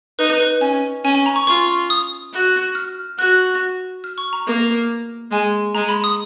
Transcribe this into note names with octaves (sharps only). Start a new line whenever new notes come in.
D#4 B4
B4
C#4 G#5
C#4 G#5
G#5
A#5
C#6
F4 C#6
D#6
F#4
F6
F#4 F#6
F6
C#6
A#5
A#3
G#3 G#5
G#3 A#5
B5
D#6